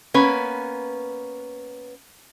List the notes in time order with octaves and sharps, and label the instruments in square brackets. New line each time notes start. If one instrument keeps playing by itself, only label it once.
[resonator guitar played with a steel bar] A#3 B3 C#4 B4